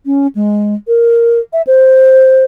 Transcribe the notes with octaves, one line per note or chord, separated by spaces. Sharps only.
C#4
G#3
A#4
E5
C5